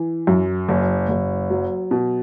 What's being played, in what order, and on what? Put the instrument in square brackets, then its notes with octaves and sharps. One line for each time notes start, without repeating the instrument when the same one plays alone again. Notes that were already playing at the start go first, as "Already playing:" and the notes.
Already playing: [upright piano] E3
F#2
F#1
F#1
F#3
B2